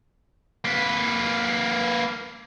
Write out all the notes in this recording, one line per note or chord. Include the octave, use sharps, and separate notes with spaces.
A#3 B4